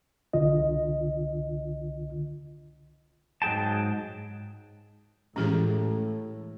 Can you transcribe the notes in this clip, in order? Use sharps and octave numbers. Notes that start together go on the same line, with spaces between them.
C2 D3 F4 D#5
G#2 F#3 G#4 G5 A5
A2 E3 G#3 C#4 G4 G#4